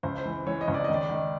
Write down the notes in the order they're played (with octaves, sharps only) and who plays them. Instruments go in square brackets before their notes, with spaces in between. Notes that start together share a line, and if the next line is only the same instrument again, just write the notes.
[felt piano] C#2 [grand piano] C5
[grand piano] C5
[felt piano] E3
[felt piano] E3 [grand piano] C#5
[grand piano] D#5
[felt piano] C#2
[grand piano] D5
[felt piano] D#3 [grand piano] D#5
[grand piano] D5
[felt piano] D#3